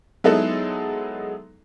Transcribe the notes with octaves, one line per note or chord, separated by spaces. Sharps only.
F#3 G#3 B3 D#4 E4 A4